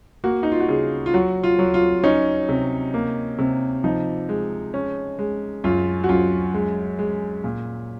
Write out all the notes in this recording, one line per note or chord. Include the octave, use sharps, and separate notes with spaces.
A#3 F#4
D#4
F4
F#4
C#3 G#4
F4
F#3 F#4
F4
F#3
F4
C#4 D#4
C3
A#3
C3
F3 D#4
G#3
C#4
G#3
F#2 F4
F#4
F#2 F4
G#3
G#3
A#2